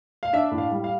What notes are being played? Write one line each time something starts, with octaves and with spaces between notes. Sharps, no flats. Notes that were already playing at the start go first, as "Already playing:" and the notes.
F5
D4 E5
A2
F5
G3
F5